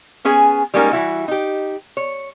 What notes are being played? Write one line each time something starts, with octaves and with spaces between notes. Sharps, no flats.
B3 C#4 G#4 G#5
G3 G#3 A#3 C#4 D#4 A#4
E3 G3 E4 F#4
D#4 G4
C#5